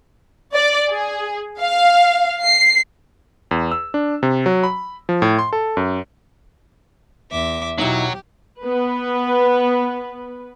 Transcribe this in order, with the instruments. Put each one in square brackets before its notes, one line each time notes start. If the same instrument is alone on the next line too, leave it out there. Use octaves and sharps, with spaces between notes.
[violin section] D5
G#4
F5
C7
[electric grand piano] E2
E6
D4
C3
F#3
B5
F3
A2
C6
A4
F#2
[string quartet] E2 E5 D6
[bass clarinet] B2 [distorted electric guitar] F#3 [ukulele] D#4 E4 [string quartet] G4
[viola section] B3 B4